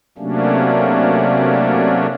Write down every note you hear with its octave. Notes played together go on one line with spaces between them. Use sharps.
C3 F#3 A3 A#3 C#4 D4